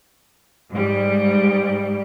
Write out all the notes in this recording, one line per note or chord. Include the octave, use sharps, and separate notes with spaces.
G#2 G3